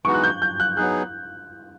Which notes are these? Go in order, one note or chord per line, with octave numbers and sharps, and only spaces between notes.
E3 G#3 B3 D#4 F#4 C#6
F#6
G6
G6
F#6
F#3 B3 D#4 G#4 F#6